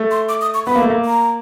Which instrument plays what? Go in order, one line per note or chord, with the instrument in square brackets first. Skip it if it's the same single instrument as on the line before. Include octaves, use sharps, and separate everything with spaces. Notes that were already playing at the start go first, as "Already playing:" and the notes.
Already playing: [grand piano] A3
[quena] C6
D6
D#6
C#6
[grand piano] B3 [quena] B5
[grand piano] A#3
A3
A#3
[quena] A#5